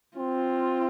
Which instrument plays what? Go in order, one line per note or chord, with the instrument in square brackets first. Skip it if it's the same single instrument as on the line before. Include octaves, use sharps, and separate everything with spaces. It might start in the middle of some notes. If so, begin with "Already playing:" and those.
[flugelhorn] C4 [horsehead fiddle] F4